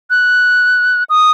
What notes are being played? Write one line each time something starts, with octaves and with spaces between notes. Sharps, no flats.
F#6
D#6